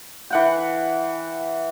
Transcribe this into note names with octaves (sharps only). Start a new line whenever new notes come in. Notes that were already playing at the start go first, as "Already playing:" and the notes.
E3 F#5 G5